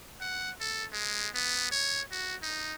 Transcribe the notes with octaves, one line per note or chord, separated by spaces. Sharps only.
F#5
A4
G#3
B3
C#5
F#4
D#4